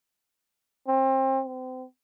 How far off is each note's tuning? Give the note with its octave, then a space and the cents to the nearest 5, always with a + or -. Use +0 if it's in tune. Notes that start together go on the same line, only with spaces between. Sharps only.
C4 +30
C4 -35